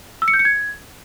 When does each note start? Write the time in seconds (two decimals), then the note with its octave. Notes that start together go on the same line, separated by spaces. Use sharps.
0.22 E6
0.28 C#7
0.34 G6
0.39 C#7
0.45 G#6